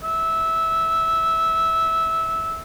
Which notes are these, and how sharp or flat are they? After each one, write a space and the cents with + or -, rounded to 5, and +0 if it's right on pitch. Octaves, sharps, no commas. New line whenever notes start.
E5 -15